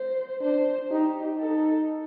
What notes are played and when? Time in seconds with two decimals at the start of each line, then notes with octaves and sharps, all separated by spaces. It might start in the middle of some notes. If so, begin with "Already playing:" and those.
Already playing: C5
0.41 D4 C5
0.90 D#4 G4
1.39 D#4 A4